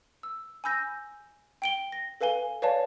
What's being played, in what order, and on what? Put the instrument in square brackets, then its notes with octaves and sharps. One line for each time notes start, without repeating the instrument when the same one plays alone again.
[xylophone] E6
G#5 B5 E6 G6 A#6
G5 D7 G7
A#6
A4 B4 F5 G#5 G7
B4 C#5 D5 F5 G#5 A5